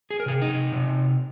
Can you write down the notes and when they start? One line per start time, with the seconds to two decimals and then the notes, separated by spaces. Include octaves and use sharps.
0.11 G#4
0.20 A#4
0.26 C3 G#4
0.42 D#4
0.72 C3